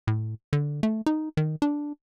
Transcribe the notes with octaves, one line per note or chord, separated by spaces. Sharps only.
A2
D3
A3
D#4
D#3
D4